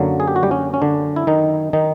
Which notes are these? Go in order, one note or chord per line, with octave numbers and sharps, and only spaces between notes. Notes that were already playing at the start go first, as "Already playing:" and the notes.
Already playing: F#2 D3 F#3 A#3
G#4
G4
F#4
G3 G4
C#4
C#4
D3 D4
E4
D#3 D#4
D#3 D#4